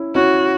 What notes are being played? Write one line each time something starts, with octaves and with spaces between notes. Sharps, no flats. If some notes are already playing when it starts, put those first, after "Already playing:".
Already playing: C#4 E4
C#4 E4 F#4